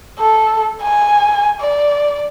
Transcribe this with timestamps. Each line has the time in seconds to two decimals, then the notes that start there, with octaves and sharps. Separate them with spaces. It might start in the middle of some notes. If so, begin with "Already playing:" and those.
0.19 A4
0.83 G#5
1.61 D5